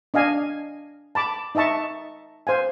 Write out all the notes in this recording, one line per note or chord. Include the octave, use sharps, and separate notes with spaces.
D4 D#5 F5 G#5
A5 B5 D6
D#4 D#5 E5 A5 C#6
C5 F5 G#5